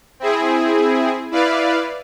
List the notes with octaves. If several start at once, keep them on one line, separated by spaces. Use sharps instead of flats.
C4 E4 G#4
E4 B4 D5 F5